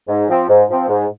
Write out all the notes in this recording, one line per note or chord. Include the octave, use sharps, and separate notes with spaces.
G#2
F3 C4
G#2
F3 C4
G#2